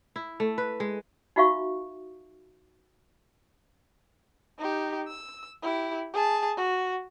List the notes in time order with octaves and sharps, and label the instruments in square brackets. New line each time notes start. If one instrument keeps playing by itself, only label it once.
[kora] E4
A3
B4
G#3
[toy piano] D#4 F4 F#4 E5 F5 C#6
[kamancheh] D#4 G4
E6
E4 G4
G#4 A5
F#4